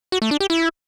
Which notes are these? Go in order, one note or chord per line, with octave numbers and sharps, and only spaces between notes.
F#4
A3
D4
G4
E4